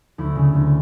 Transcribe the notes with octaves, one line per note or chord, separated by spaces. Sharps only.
D2 E4
C#3
D2